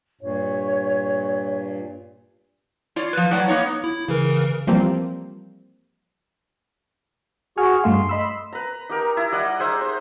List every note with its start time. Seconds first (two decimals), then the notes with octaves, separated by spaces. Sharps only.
0.21 G2 A#2 C#5
2.96 F4 C#5 D5
3.13 F3 B4
3.31 A2 F#3 C#5 D5 F#5
3.48 A#3 B3 D#4 C#5
3.84 E4
4.08 C#3 E3 A#4
4.67 E3 F3 G3 A#3 C4
7.57 F#4 G#4 G#5 C#6 F6
7.84 G2 A3 F5 C6
8.09 D#5 B5 E6
8.53 B4 A#5
8.89 D#4 G4 A#4
9.17 E4
9.32 G3 D#5 F#5
9.59 D#4 G#4 C5 E5
9.81 C5